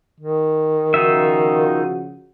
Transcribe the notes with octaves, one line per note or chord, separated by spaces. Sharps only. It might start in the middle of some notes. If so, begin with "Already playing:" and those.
D#3
C#3 F3 D#4 F4 F#4 E5